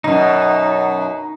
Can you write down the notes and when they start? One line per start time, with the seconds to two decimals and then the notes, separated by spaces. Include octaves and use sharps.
0.04 F#2 B2 D#4